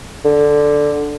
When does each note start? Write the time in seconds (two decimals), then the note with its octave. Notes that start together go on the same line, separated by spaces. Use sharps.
0.25 D3